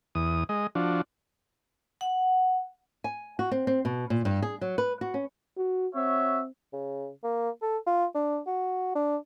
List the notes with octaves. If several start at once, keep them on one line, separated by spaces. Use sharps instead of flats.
E2 D#6
G#3 D#5
F3 D4 F#4
F#5
G#5
F#4
C4
C4
B2
A#2
G2
G#4
F#3
B4
F#4
C#4
F#4
C4 F#4 C#5 E5
C#3
A#3
A4
F4
D4
F#4
D4